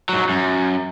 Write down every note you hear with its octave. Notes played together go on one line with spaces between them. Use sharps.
G#2 F#3
F#2